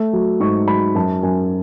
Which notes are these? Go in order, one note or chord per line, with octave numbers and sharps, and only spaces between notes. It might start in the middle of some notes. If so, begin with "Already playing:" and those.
Already playing: A3
F#3
G#2 C#6
F#3 B5
F#2 A5
F#2 G#5